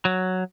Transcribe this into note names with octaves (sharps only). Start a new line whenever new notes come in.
F#3